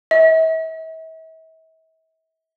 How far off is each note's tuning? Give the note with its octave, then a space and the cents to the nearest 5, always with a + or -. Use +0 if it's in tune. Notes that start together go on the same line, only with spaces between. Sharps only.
E5 -40